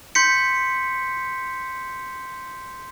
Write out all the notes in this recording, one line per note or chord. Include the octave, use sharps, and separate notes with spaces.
C6 G6 B6 C#7